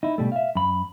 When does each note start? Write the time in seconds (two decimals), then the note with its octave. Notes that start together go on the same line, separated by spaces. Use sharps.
0.03 D#4 E4
0.18 B2 G3 A3
0.32 E5 F5
0.55 F#2 B5